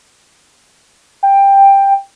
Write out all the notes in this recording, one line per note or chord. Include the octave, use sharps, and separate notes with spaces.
G5